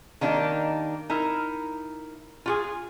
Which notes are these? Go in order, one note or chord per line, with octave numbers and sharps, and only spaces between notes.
D#3 A#3 D4 D#4 F4 G4
D#4 E4 A#4
F4 F#4 G#4